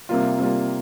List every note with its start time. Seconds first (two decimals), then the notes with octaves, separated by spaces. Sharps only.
0.09 C3 G3 A#3 F4
0.39 C3 G3 A#3 F4